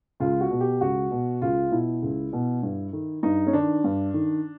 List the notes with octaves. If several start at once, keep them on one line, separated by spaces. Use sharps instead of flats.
C#2 F4
F#4
B2
G4
C#2 F#4
B2
C#2 F4
B2 E4
C#2
B2
G2
D#3
G2 D#4
C#4
D#3 D4
G2
D#3